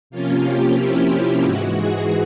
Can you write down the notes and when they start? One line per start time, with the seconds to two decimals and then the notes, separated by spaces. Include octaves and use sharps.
0.10 C3 F3 A#3 C#4 F4
0.44 G4
0.77 E4
1.43 G#2 E3 G#3 F#4
1.75 G#4